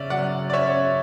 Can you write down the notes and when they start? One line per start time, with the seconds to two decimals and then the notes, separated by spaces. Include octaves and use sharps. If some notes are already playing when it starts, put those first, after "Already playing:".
Already playing: C#3 C#4 D5 E5
0.10 F#3 D5 F#5
0.50 D5
0.53 C#4 C#5 E5